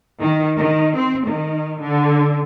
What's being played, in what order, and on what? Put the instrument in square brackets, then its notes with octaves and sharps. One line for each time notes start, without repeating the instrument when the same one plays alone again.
[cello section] D#3
D#3
C4
D#3
D3